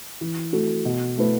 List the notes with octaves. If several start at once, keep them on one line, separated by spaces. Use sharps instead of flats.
E3
A3 F#4 A4
B2
A3 E4 B4